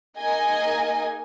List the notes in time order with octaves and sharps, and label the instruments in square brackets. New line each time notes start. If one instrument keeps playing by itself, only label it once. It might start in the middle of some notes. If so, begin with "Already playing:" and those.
[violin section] A#3 D#4 G#4 D#5 G#5